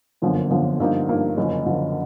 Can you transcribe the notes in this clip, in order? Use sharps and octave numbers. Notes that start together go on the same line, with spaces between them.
G1 F#2 D3 F3 A#3
G1 F#2 D3 F3 A#3
G2 D3 F3 A#3 D#4
G2 D3 F3 A#3 D#4
F#1 F#2 D3 F3
F#1 F#2 D3 F3